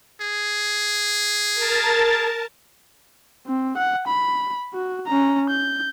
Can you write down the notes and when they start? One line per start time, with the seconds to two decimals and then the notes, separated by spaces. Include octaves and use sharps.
0.21 G#4
1.55 A#4 A5 A6
3.47 C4
3.78 F#5
4.08 B5
4.74 F#4
5.07 C#4 A#5
5.49 G6